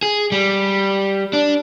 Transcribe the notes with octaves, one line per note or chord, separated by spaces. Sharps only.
G#4
G3
D4